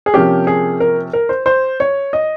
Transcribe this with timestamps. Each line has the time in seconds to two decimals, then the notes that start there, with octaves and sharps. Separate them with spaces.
0.06 G#4
0.14 C3 F3 A#3 C#4 G4
0.47 G#4
0.80 A#4
1.13 A#4
1.29 C5
1.46 C5
1.80 C#5
2.13 D#5